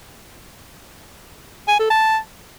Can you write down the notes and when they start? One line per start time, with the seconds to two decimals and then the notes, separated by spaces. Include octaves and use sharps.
1.68 G#5
1.79 A4
1.90 A5